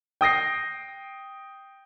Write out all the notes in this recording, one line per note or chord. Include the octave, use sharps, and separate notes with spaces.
G5 D#6 A#6 C7